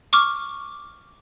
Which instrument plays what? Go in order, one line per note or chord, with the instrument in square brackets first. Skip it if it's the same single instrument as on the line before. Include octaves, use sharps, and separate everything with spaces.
[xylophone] C#6 D6 F6